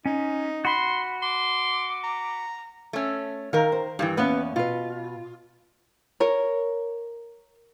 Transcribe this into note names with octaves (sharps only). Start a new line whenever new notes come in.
C#4 D#4
F#4 B5 C6
C6 D6
A#5
A3 C#4
D#3 A#4 F5
C5
G2 C#3 E3 G4
E2 A#3 B3 C#4 B4
B2 F4 B4
A#4 C#5